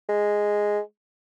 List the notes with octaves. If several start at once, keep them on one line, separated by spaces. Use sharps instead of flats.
G#3